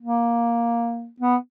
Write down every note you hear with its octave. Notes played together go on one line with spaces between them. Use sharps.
A#3
B3